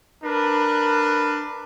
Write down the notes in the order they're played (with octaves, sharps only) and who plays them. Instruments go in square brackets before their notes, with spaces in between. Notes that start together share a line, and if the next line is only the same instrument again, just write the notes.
[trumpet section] D4 A#4 B4